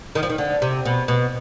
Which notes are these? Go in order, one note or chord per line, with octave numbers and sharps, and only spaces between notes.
D#3
F3
D#3
D3
C3
B2
B2